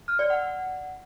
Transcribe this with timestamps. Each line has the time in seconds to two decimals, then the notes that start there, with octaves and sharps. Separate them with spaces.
0.08 F6
0.19 D5
0.30 F#5